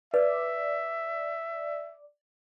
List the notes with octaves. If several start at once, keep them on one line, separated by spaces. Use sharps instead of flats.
B4 D5 E5